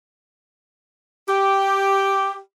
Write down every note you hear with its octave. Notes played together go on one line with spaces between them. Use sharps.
G4